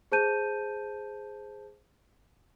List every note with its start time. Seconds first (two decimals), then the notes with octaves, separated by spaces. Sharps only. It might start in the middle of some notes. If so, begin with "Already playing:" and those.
0.12 G#4 C5 A5 G6 D#7